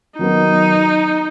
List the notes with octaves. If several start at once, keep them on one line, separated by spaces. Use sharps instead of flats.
D#3 F#3 B3 D#4